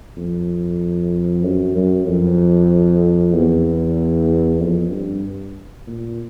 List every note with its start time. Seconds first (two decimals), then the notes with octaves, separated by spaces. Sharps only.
0.17 F2
1.43 F#2
1.76 F#2
2.06 F2
3.34 E2
4.61 F2
4.92 G2
5.87 A#2